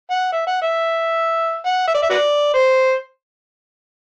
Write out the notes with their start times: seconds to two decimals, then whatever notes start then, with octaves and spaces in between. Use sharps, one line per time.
0.10 F#5
0.32 E5
0.47 F#5
0.62 E5
1.65 F#5
1.87 E5
1.94 D5
2.03 E5
2.10 F#4 B4 D5
2.54 C5